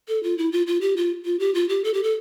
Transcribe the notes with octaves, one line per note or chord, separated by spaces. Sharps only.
A4
F4
E4
F4
F4
G4
F4
F4
G4
F4
G4
A4
G4
A4